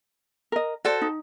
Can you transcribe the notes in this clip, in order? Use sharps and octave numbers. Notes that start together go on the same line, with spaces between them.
A#4 D#5
F#4 A4 C5 D5
D#4